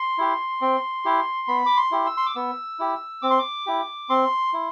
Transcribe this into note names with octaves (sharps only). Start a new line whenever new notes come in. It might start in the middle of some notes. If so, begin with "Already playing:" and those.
Already playing: C6
E4 G4
C4
E4 G4
B3 B5
D6
C6
E4 G4
E6
C6
D6
B3 E6
E4 G4
C4 D6
C6
D6
E4 G4
C4 C6
E4